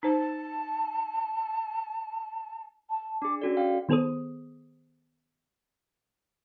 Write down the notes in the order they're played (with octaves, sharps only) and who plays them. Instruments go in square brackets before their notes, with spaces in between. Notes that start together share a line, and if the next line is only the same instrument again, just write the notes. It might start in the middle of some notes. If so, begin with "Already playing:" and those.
[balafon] D#4 C5 [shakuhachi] A5
[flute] A5
[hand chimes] D4 G#4 [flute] D6
[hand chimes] C#4 F#4 D5 [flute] A4
[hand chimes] F5 G5
[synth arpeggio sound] D#3 B3 G#4 A4 C5 D#6